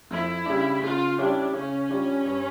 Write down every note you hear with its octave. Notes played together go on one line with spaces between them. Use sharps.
F2 E4
C#3 G3 D4
C#3 F4
G3 C#4 D4 E4 G4
C#3 C#4
G3 D4 F4
G2